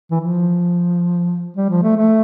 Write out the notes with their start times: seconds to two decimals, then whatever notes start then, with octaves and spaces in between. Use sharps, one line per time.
0.11 E3
0.20 F3
1.57 G3
1.70 F3
1.83 A3
1.97 A3